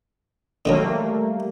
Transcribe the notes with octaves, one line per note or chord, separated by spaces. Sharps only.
D3 D#3 F#3 G3 A3 A#3